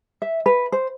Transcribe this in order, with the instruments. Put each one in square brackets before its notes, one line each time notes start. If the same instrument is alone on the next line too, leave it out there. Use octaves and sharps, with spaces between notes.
[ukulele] E5
B4
C5